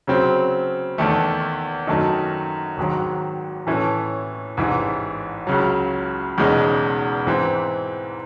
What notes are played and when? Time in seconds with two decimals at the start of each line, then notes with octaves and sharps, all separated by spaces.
0.07 C#3 F#3 C4
0.98 E2 D#3 A3
1.87 F#2 D#3 A3 D#4
2.77 G#1 G#2 D#3 F#3
3.67 A2 E3 A3 C#4
4.57 A1 G#2 E3
5.47 C#2 C#3 F#3
6.37 E1 E2 C#3 G#3 D#4
7.26 G#2 E3 C4